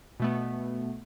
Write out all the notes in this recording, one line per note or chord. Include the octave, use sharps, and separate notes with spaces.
B2 A3 B3